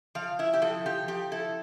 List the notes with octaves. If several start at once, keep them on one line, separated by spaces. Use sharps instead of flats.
F3 F5
E4 E5
G4
F3 A4
F3 G4
F3 G4
E4 A4